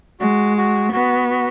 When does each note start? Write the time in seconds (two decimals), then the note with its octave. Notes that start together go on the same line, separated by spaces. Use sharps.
0.20 G#3 F#4
0.57 F#4
0.92 B3 F#4
1.30 F#4